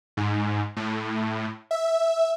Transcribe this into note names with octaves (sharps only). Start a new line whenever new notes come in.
G#2
A2
E5